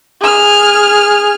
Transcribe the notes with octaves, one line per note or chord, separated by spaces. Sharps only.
G#4 F6